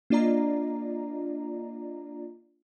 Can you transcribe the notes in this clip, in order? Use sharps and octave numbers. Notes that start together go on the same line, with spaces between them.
A#3 D4 F4 D5 D#5 A#5